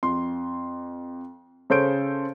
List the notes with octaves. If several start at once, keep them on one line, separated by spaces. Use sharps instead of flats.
F2 C6
C#3 A4 C5 C#5 G6 D7